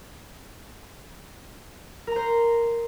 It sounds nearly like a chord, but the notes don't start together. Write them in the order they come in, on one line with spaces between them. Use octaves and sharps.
A#4 A#5 C5